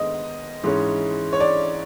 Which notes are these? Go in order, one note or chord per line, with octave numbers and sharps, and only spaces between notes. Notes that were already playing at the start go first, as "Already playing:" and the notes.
Already playing: G#2 D#3 G#3 B3 D#5
G#2 E3 G#3 C#4
C#5
D5